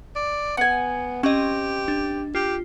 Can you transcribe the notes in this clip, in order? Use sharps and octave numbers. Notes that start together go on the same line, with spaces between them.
D5
B3 F#5 G#5
C4 C#4 G4 D#5
D4
F4 G4